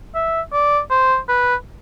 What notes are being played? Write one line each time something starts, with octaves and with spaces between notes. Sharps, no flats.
E5
D5
C5
B4